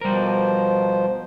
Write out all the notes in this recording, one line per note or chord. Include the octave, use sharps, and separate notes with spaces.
B2 F3 G3 A#4 C5